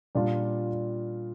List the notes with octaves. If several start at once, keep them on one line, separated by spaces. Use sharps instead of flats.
A#2 G3 D4 F4